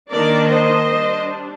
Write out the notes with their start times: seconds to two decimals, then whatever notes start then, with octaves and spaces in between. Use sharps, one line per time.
0.10 D#3 A#3 D4 A#4 D5
0.49 C5 D#5
0.87 G3 D4